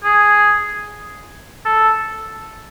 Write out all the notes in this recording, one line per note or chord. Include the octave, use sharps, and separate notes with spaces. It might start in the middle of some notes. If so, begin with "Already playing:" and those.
G#4
A4